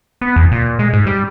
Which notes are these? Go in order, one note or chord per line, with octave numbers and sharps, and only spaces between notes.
B3
E2
A#2
G#3
G#2
G3